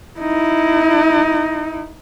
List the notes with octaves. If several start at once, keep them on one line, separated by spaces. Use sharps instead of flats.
D#4 E4